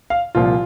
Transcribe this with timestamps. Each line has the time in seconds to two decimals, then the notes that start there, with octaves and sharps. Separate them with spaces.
0.10 F5
0.35 C2 A#2 F3 F4